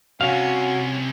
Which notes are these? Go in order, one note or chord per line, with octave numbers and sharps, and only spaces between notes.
C2 C3 C#4 F#4 F5